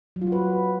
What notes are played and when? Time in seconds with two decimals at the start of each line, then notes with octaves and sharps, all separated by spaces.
0.16 F#3
0.21 F4
0.27 F#4
0.32 B4